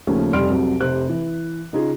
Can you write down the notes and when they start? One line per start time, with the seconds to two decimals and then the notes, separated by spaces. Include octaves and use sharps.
0.07 D#2 C#3 F3 A3 C#4
0.33 F1 G3 D5 C6 F6 D7
0.50 C2 F2 F#3
0.80 F1 C3 C5 F#6
1.09 E3
1.73 C#3 D#4 F4 G#4